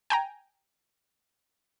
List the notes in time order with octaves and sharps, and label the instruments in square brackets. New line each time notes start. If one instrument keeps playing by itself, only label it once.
[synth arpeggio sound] G5 G#5 A#5